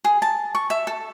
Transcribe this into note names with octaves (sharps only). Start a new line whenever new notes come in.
G#4
A5
C#6
E5
A4